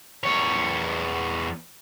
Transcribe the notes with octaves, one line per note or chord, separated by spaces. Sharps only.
E2 C#5